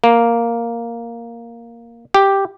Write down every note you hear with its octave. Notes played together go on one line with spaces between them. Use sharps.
A#3
G4